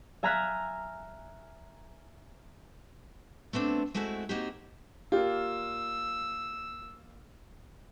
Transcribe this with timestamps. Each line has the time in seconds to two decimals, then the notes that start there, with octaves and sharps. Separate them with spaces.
0.23 E5 G#5 A#5 F6 F#6 B6
3.53 A3 B3 C4 D4
3.94 G#3 A3 C4 E4 F#4
4.29 A#3 C4 D#4 F#4 G4
5.12 A#3 F4 G4 D5 E6